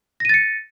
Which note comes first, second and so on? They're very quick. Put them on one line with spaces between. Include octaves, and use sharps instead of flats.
A#6 D#7 A6 C#7